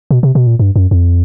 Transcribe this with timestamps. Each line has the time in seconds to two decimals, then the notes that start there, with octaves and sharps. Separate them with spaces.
0.11 B2
0.23 C3
0.35 B2
0.47 A#2
0.60 G2
0.76 F#2
0.91 F2